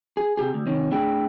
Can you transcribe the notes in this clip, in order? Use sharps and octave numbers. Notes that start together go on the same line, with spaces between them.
G#4
C3 G4 G#4
D2
C3 D#3 C#4
A2 D4 E4 G#4 G5